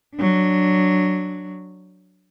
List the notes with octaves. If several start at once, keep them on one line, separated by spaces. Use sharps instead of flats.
F#3 D4